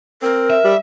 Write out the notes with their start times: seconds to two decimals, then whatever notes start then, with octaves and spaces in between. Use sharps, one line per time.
0.22 C4 A#4
0.50 E5
0.64 G3